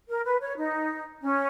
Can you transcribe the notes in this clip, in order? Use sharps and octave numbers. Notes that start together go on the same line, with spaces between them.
A#4
B4
C#5
D#4
C#4